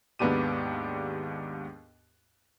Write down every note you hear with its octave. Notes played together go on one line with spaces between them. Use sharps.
D#2 G#2 B3 D4 G4 D#7